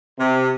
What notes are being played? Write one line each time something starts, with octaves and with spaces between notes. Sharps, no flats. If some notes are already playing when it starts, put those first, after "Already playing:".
C3